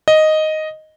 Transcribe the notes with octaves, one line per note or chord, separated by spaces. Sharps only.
D#5